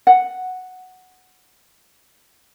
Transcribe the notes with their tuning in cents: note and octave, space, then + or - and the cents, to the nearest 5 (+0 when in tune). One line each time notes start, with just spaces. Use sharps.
F#5 +0